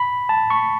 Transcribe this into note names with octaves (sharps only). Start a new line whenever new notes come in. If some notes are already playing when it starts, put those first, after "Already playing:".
Already playing: B5
A5
C#6